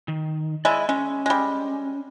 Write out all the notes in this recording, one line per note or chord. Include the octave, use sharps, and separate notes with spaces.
D#3
G#3 E4 D5 D#5
G#3 C#4
G3 G#3